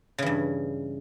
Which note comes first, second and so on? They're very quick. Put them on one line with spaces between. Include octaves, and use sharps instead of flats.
C#3 E3 G2